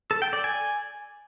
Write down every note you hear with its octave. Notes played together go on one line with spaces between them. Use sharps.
A4
G5
D5
G#5